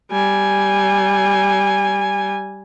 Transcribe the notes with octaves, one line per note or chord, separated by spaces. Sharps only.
G3 G#5